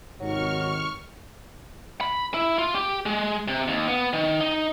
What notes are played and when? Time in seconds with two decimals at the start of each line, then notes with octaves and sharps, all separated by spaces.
0.20 G#1 C3 D#3 F#3 C#6 F6
2.01 B5
2.34 E4
2.58 F4
2.75 G4
3.06 G#3
3.48 C3
3.68 D#2
3.88 B3
4.13 D#3
4.41 D#4